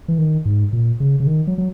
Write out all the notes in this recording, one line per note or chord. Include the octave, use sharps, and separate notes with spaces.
E3
D#3
G#2
A#2
C#3
C#3
D#3
F#3
F#3